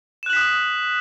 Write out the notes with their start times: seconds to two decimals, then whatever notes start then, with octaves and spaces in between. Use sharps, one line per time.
0.23 E7
0.26 F#6
0.30 F#7
0.33 B6
0.36 D#6